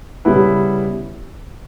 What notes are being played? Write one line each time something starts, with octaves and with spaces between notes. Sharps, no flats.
C#3 G3 B3 E4 B4